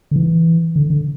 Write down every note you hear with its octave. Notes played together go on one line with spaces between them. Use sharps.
D3
E3
D3
D3